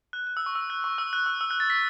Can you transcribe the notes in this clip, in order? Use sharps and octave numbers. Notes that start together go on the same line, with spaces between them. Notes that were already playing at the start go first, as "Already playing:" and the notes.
F#6
F#6
E6
C#6
E6
F#6
C#6
E6
F#6
E6
E6
F#6
A6
B6